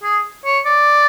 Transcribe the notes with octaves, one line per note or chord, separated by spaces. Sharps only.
G#4
C#5
D5